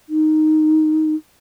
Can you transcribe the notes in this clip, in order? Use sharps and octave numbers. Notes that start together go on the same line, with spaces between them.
D#4